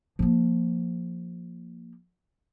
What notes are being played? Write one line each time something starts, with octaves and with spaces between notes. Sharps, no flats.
F3 A#3